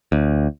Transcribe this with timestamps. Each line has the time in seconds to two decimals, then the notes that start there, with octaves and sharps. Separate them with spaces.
0.12 D2